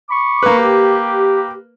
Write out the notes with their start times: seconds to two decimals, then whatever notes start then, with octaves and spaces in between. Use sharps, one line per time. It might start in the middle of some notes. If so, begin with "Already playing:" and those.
0.10 B5 C#6 D6
0.43 A#3 B4
0.58 G4